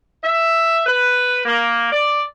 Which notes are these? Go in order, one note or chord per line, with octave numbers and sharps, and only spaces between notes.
E5
B4
A#3
D5